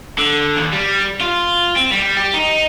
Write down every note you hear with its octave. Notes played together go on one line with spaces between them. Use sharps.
D3
D#2
G3
F4
C4
G3
G4
D#4